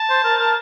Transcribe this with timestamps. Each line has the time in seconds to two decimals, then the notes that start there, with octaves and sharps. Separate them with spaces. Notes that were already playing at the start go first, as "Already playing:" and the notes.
Already playing: A5
0.10 C5
0.24 A#4
0.40 A#4